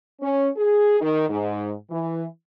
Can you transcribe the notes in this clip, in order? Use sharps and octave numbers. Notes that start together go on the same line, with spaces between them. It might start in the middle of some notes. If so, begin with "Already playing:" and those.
C#4
G#4
D#3
G#2
E3